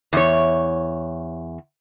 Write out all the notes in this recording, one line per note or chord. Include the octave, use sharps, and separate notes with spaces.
E2 C#5